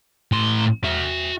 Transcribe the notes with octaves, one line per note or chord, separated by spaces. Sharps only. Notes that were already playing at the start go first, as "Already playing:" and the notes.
A2 C6
F#4 E5